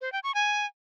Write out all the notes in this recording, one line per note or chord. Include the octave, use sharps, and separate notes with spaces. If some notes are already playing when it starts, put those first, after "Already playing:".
C5
G5
C#6
G#5